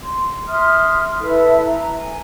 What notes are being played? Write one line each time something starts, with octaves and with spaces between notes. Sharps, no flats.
C6
E5 C6 D#6 F6
E4 A4 B4 E5
A#5
G#5